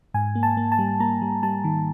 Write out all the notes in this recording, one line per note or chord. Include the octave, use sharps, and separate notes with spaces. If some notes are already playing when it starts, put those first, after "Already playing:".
G#2 G#5
A#3
A5
A#3
A5
G3
A#3 A#5
G3
G3 A5
D#3